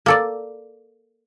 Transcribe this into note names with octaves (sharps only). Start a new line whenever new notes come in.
A#3 A4 D5